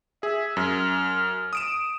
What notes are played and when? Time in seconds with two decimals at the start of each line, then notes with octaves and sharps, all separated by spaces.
0.23 G#4 E5
0.57 F#2 F6
1.53 D#6 D7 E7